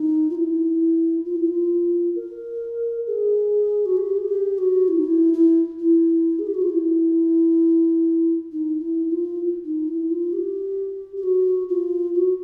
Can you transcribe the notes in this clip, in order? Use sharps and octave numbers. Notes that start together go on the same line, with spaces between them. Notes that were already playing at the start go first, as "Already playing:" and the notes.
Already playing: D#4
F4
E4
F4
E4
F4
A#4
G#4
F#4
G4
G#4
G4
F#4
E4
D#4
E4
E4
E4
G#4
G4
F#4
F4
E4
D#4
E4
F4
D#4
E4
F4
G4
G4
F#4
F4
F#4